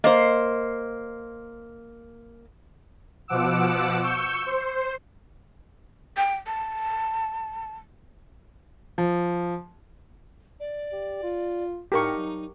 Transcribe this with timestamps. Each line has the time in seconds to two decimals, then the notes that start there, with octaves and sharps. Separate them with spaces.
0.04 A#3 C5 D#5
3.28 B2 F3 F#5 D6 E6
4.02 C#6 E6 G6 C#7
4.46 C5
6.17 G5
6.47 A5
8.98 F3
10.60 D5
10.92 G4
11.23 F4
11.92 A2 D#4 G4 A#4 C#6
12.14 F#3